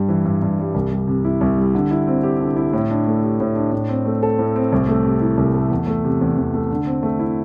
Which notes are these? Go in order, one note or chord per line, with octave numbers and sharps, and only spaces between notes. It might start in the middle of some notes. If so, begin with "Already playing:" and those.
Already playing: G2 G3
E3
G2
G2
G3
C2
G3
C3
E4
C2
G3
D3
E4
C4
G4
D3
E4
A2
D4
A3
G4
A2
D4
A2
C4
A3
A4
A2
C4
C2
A3
C3
E4
C2
A3
E2
A3
C3
E2
E2
A3
D3
C4
A3
E4